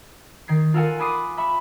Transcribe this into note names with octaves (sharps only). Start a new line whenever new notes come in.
D#3 G#6 C7
F4 A4 A#4 F#5 G#5
G#5 B5 D6 D#6 C7 D#7
E5 B5 C#6